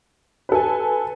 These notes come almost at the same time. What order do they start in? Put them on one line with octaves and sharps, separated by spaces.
B4 A4 G#5